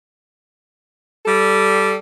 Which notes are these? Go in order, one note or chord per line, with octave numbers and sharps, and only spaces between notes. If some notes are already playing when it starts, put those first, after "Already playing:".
G3 A4